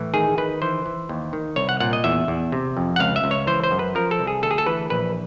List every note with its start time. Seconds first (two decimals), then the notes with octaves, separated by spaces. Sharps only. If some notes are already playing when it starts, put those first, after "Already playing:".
Already playing: A2 E3
0.14 D#3 G#4
0.38 D#3 B4
0.62 E3 C5
0.86 E3
1.09 D#2
1.33 D#3
1.56 C2 C#5
1.69 F#5
1.80 A#2 F#5
1.93 D#5
2.04 E2 E5
2.28 E2
2.52 C3
2.77 F2
2.96 F#5
3.00 C#2 F5
3.16 E5
3.24 C#2
3.31 C#5
3.47 E3 C5
3.64 C5
3.71 F#2
3.79 B4
3.95 F3 A#4
4.11 A4
4.19 C2
4.27 G#4
4.43 D2 A4
4.51 G#4
4.58 A4
4.66 E3 B4
4.90 A#1 B4